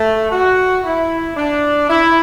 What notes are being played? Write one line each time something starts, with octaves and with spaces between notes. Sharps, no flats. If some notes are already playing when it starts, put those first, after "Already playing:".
Already playing: A3
F#4
E4
D4
E4